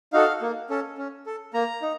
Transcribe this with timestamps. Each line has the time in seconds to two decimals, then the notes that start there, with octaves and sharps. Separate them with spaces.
0.13 D#4 F#4 A4 F5
0.42 A#3
0.70 C#4 A4
0.98 C#4
1.26 A4
1.54 A#3 A#5
1.82 D#4